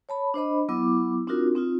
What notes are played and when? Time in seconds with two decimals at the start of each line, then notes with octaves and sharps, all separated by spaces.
0.09 C#5 A5 B5
0.34 D4 C5 D#5 B5
0.69 F#3 B3 E4 D6
1.27 C4 D4 D#4 F4 F#4 A#4
1.55 C4 D#4 F4